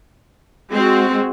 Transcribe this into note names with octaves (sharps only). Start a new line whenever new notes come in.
G#3 C4 F#4